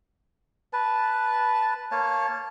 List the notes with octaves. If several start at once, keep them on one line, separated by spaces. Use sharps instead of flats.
B4 A5
A#3 C#5 A5